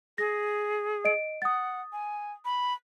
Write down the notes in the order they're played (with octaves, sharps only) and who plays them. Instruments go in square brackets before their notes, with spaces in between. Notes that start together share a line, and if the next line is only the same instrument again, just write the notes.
[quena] G#4 [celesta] A#6
[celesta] D#5 D7
[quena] F#5 [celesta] D#6 A6
[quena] G#5
B5